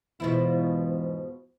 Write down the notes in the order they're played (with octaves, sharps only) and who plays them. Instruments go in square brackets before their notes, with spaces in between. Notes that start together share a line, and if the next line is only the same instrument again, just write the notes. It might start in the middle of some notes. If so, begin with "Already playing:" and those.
[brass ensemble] E2 G#2 [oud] B2 F3 E4